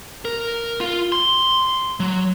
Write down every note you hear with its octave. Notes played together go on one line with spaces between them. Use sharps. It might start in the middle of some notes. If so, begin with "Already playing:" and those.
A#4
F4
C6
F#3